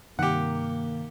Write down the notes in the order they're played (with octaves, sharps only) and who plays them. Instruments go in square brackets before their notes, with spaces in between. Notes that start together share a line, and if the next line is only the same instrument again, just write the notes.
[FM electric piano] G2 C3 D#3 [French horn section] A#3 [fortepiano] G4 F#5